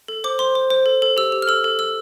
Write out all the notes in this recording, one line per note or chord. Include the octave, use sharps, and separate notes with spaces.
A4
C5 D6
C5 C6
C5
C5
A4
A4
G4 E6
G4
F6
A4 E6
A4
A4 E6